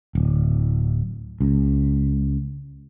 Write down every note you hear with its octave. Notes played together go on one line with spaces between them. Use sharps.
D1
C#2